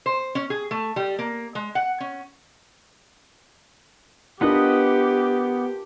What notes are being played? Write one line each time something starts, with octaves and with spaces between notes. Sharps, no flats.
C5
C#4
G#4
A3
G3
A#3
G#3
F#5
C#4
B3 D4 F4 G4 A#4 B4 D#5